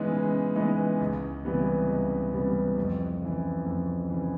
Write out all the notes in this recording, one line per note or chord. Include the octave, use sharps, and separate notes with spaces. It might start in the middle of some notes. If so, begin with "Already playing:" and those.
Already playing: C#3 E3 G#3 B3 D#4
C#3
E3 G#3 B3 D#4
C#2
C3 E3 G3 B3
C#2
C3 E3 G3 B3
F2
C#3 E3
F2
C#3 E3